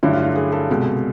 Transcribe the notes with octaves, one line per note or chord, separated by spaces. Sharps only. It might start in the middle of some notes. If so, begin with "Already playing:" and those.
G2 D3 F#3 A3 E4
F4
F4
G#4
A4
C2 B2 G#3